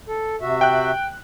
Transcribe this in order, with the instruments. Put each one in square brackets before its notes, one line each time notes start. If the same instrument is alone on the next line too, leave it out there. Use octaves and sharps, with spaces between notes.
[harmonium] A4
C3 F#4 E5
[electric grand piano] G5 F#6